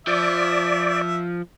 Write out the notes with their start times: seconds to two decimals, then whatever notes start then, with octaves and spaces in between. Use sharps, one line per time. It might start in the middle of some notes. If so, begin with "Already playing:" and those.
0.07 F3 D5 E5